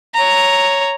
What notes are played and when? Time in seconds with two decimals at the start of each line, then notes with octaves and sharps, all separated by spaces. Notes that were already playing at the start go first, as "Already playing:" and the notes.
0.14 C#5 A#5